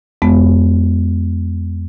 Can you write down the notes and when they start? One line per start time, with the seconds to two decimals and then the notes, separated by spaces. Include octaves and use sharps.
0.22 F2 G#3 B3